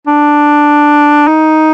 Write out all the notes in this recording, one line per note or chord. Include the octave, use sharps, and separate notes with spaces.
D4
D#4